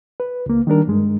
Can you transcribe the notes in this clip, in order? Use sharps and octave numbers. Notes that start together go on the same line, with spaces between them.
B4
C#2 A#3
D#3 G3 D4 A#4
G2 G#3